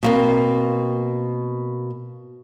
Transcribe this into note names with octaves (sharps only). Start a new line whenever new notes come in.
B2 A#3 C4